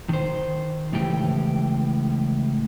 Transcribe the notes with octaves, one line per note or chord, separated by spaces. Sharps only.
D#3 C5
C#2 A2 E3 G4